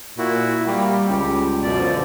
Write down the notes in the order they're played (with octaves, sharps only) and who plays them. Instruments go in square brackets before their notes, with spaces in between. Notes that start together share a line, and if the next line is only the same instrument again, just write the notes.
[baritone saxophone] A#2 [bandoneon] E4 F#4
[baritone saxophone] G3 [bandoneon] A#3
[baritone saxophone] C#2 [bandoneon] G4
[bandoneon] F#2 B2 D5
[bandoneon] D3 [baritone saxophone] F3